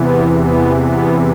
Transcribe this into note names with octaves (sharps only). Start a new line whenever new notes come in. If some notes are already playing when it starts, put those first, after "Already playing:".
Already playing: E2 C3 E3 B3
B3
B3